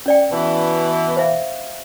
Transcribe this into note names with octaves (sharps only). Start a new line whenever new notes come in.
C#4 D5 G5
B2 E3
C5 E5 F5